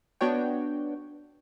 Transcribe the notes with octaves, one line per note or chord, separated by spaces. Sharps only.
B3 D4 F#4 C#5 G5